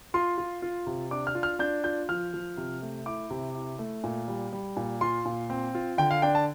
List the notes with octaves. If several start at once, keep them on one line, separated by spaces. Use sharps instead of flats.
F4 C6
F4
F4
C3
D4 D6
F6
F4
F6
D4 G6
F4 G6
F3 F6
F3
C3
A3
E4 D6
C3
E4
A3
A#2
G3
G3
A#2
F4 C6
A#2
C4
F4
D3 G5
F5
D4 G5
A5